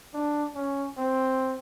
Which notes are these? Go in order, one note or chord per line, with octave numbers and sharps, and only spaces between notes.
D4
C#4
C4